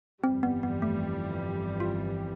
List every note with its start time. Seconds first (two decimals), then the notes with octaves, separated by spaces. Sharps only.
0.23 G1 F2 E3 G3 C4
0.43 B3
0.63 B3
0.82 A3
1.80 F4